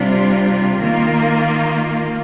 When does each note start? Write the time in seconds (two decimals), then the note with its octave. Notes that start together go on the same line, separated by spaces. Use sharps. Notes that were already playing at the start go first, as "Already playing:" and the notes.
Already playing: C3 G3 D4 F4
0.81 D#3 A#3 F4